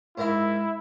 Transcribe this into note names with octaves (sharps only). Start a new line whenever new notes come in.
G#2 E4 A#4 F5